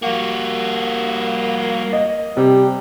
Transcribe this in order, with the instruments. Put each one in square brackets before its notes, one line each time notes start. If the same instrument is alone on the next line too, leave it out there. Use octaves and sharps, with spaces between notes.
[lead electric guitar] G3 F#4 [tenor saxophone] A#3
[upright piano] D#5
[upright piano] C3 [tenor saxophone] G3